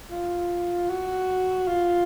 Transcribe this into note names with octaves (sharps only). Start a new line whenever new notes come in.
F4
F#4
F4